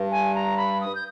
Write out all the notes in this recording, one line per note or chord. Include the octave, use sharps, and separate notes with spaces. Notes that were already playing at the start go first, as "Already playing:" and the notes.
Already playing: G2
G#5
A#5
B5
D#6
G6